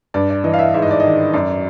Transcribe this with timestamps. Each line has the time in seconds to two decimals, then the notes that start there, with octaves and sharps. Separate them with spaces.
0.14 G2 D5
0.30 D5
0.44 E3 D#5
0.54 F5
0.59 E5
0.74 G#2 E5
0.82 D#5
0.91 D5
1.00 D#3 D#5
1.33 F#2 D5